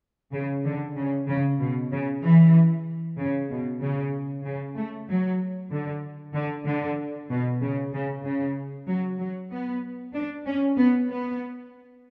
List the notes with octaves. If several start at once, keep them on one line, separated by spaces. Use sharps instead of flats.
C#3
D3
C#3
C#3
B2
C#3
E3
C#3
B2
C#3
C#3
A3
F#3
D3
D3
D3
B2
C#3
C#3
C#3
F#3
F#3
B3
D4
C#4
B3
B3